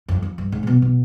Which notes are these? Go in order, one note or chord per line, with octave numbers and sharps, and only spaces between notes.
F2
F2
G2
G#2
C3
B2
B2